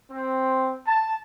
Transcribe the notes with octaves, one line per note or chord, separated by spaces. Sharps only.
C4
A5